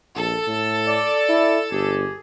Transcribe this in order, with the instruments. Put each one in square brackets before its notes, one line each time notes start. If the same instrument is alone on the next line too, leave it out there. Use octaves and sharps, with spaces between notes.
[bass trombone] A#1 [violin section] A4
[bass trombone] A2
[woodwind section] D5
[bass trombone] E4
[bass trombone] G1 [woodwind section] G4 G#4